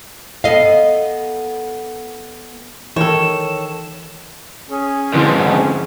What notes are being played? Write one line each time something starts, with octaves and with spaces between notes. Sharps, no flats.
B3 A4 D#5 F5
D#3 E3 A4 C#5 E7
C#4 G#4
F2 G#2 D3 E4 C6